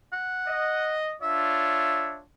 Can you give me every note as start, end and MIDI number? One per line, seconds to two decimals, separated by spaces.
0.13 0.98 78
0.48 1.16 75
1.22 2.23 62
1.22 2.23 65
1.22 2.23 73
1.22 2.16 76